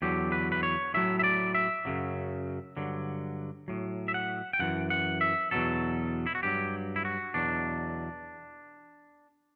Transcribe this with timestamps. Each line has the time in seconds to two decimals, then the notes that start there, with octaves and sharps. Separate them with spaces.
0.02 E2 D3 F#3 G4
0.32 B4
0.52 B4
0.63 C#5
0.94 A2 F#3 E5
1.19 E5
1.24 D5
1.55 E5
1.85 F#2 C#3 F#3
2.77 G2 D3 F#3
3.68 A2 F#3
4.08 E5
4.14 F#5
4.53 G5
4.59 F#2 E3 F#5
4.90 F#5
5.21 E5
5.51 E2 B2 F#3 A4
6.26 E4
6.35 F#4
6.43 G2 F#3 G4
6.96 E4
7.05 F#4
7.34 E2 B2 F#3 D4